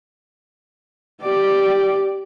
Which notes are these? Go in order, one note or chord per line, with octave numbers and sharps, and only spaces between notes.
G4 D5